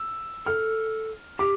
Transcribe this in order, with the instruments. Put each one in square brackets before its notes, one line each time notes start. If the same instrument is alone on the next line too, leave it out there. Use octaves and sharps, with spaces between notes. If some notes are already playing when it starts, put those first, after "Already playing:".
Already playing: [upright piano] E6
[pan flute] A4 [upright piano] F6
[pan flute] G4 [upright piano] D6